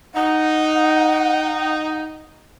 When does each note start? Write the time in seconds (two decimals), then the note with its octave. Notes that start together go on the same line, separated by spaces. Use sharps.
0.15 D#4 F#5